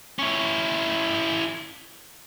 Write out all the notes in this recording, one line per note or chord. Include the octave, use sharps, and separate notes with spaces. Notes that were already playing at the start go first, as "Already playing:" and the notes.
C#4 E4